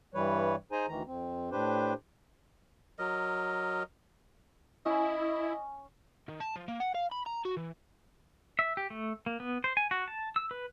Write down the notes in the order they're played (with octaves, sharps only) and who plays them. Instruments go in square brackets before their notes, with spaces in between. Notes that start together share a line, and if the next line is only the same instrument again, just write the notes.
[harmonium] G2 E3 G3 B4 C#5
D#4 G#4 C5 G#5 A#5
D2 D#3 E3 A#5
F2 C4
A2 D4 G4 B4 C5
[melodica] F#3 A#4 D#5
[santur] C#4 [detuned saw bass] E4 [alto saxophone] D#5
[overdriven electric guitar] D#3
A5
F3
A#3
F#5
F5
B5
A#5
F#4
E3
[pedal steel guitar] E5
G4
A3
A#3
B3
C5
G#5
F#4
A5
E6
B4